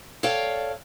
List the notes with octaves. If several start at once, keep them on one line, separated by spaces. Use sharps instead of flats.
A4 C#5 D5 F5 G5